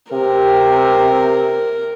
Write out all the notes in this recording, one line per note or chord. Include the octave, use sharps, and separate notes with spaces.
C3 A#4